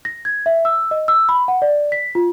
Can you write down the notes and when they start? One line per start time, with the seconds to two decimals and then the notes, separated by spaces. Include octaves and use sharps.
0.05 A#6
0.25 G#6
0.46 E5
0.65 E6
0.91 D#5
1.08 E6
1.29 B5
1.48 F#5
1.62 D5
1.92 B6
2.15 F4